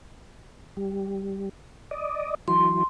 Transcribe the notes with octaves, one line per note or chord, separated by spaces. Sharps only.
G3
D5 D#5
E3 F#3 C6